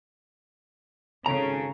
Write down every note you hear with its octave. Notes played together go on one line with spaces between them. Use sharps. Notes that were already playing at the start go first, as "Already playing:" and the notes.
G#1 C#3 C#4 A4 A#5